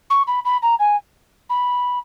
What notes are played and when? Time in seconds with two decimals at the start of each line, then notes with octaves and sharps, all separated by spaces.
0.10 C#6
0.27 B5
0.45 B5
0.62 A#5
0.79 G#5
1.50 B5